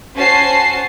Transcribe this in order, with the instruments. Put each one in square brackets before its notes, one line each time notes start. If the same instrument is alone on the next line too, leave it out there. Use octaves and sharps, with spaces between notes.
[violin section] C#4 F#4 C5 A5 C7